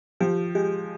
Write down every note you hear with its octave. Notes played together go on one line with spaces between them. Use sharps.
F3 G4
G#3 G4